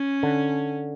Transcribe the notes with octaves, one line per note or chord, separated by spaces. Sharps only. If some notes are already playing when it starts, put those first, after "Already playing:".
Already playing: C#4
D3